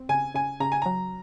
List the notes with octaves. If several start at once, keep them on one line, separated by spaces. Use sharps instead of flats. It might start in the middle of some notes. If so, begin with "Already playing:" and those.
Already playing: C4
C#3 G#5
C#3 G#5
C#3 A#5
G#5
F#3 A#5